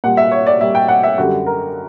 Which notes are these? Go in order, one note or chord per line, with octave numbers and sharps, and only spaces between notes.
A#2 G3 F#5
E5
C#5
D5
A#2 G3 E5
G5
F#5
E5
F#2 D3 G3 F#4
A#4